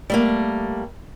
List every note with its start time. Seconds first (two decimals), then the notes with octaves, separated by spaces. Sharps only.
0.10 G3 A3 A#3